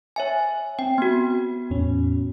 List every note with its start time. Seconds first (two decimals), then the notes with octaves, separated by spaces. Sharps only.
0.16 C#5 E5 G#5
0.79 C4 G5
0.98 B3 F#4
1.70 E2 A2 C#4